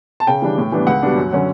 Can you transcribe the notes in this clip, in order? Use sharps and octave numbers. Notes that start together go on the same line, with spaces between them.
A5
C#3 G5
E3 G3 D4
A2
E3 G3 B3 D4
C#2 F#5
B2 G3 B3 D4
F#2
D3 F#3 C#4